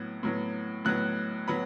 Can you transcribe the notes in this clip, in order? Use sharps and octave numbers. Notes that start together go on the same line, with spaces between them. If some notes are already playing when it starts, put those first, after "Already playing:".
Already playing: A2 F#3 B3
A2 F#3 B3
A2 F#3 B3 F#6
F#3 B3 B5